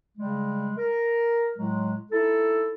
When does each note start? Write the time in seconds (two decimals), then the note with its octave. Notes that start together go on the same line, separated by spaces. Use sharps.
0.18 C#3 G3 G#3
0.78 A#4
1.57 A2 F#3 G#3
2.12 D#4 E4 A4